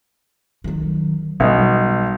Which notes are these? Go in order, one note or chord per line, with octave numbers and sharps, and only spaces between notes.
D#3 F#3
B1 G3 G#3 D#5